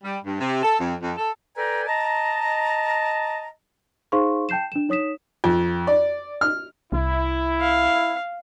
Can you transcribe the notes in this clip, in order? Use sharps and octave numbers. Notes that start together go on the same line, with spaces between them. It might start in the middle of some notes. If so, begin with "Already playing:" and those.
G3
G2
C3
A4
F2
F2
A4
A4 B4 D5 G5 G#5 A#5
D#5 A5 A#5
D#4 G#4 C5 F5 C6 C#6
G5 A5 G6 C7 E7
D4 E7
D#4 C#5 D#6 B6 E7
F2
D5
F6
C2 E4
F5